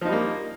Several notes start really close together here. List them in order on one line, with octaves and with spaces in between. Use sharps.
F3 D#4 G3 A#3